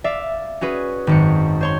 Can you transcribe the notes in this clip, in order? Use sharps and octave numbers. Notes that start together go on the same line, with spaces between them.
D5 E5 F5
C#4 F#4 G#4 B4
G#1 F#2 C#7
C5 C#5 C6